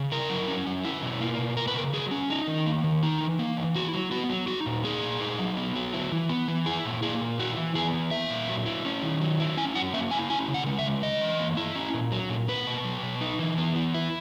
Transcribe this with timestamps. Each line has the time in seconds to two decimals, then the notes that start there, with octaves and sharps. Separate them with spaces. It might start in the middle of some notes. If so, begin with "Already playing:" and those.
Already playing: C#3
0.12 E4 A#4
0.30 F#3
0.48 C#4
0.67 F#3
0.85 E4
1.02 B2
1.21 A#3
1.39 B2
1.57 A#3 A#4
1.67 B4
1.75 C#3 A#4
1.93 F#3 G#4
2.11 C#4
2.30 D#4
2.48 D#3
2.66 A#3
2.84 D#3
3.03 D#4
3.21 E3
3.39 A#3
3.57 E3
3.75 E4 F#4
3.93 F#3
4.11 B3 F#4
4.29 F#3
4.48 D#4 F#4
4.66 A#2
4.84 A#3 G#4
5.03 A#2
5.21 D#4
5.39 F#3
5.57 B3
5.76 F#3
5.94 E4
6.12 E3
6.29 B3
6.48 E3
6.66 E4 G#4
6.85 A#2
7.02 A#3 G#4
7.21 A#2
7.39 E4 F#4
7.57 E3
7.75 B3 G#4
7.93 E3
8.11 A#3 E5
8.30 A#2
8.49 F#3
8.66 E4
8.85 C#4
9.02 D#3
9.21 F#3
9.40 E4
9.57 C#4 G#5
9.75 F#3 F#5
9.94 A#3 E5
10.11 E4 G#5
10.29 C#4 G#5
10.48 C#3
10.54 F#5
10.66 G#3
10.79 E5
10.84 C#3
11.03 C#4 D#5
11.21 E3
11.39 A#3
11.57 E4
11.75 C#4
11.94 A#2
12.12 F#3
12.30 A#2
12.48 A#3 B4
12.67 B2
12.85 F#3
13.03 B2
13.21 D#4
13.39 E3
13.58 B3
13.76 E3
13.94 E4